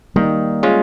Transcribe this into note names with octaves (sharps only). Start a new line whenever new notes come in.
D#3 G3 A#3
G#3 C#4 F4